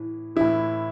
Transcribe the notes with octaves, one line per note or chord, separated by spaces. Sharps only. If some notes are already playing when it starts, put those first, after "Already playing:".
Already playing: A2 E3
A2 E3 E4